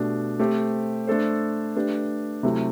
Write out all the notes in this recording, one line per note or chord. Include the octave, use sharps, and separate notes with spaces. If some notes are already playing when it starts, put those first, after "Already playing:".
Already playing: B2 A3 D4 G4
A3 C4 G4 C5
A3 D4 A4 C5
A3 D4 G4 B4
C3 F#3 A3 E4 G4